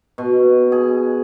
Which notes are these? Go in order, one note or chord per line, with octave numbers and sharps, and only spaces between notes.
B2
G#4